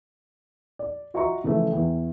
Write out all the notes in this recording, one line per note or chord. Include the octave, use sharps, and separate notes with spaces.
D5
F4 F#4 D#5 E5 A#5 C#6
C#3 E3 F3 A3
E2 E3 G5